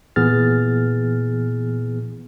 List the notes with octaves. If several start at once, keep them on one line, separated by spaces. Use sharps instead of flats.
A#2 E3 B3 G#4 F6 A6